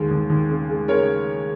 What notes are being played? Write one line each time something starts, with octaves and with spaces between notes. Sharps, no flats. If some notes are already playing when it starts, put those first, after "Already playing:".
Already playing: D#2 G#3
D#2
D#2
C#3
G#3
C#3 A#4 C#5